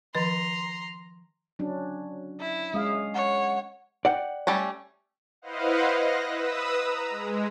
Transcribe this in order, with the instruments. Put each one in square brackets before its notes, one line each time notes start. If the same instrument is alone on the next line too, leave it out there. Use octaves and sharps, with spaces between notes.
[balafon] D#3 F3 D#5 [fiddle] A#5 C6
[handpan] F#3 C#4 D4
[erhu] E4
[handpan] G#3 C#4 F5 [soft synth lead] D#6
[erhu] C#5 [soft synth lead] F#5
[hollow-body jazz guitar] D5 F#5 G5
[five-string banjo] G3 A3 C#4
[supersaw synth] E4 B4 C5 D#5 F5 F#5
D#5 F#6 A#6
B4 D#6 E6
A#5
G#3